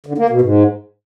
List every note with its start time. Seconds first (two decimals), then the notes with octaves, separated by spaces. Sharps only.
0.06 D3
0.18 A#3
0.30 B2
0.41 G#2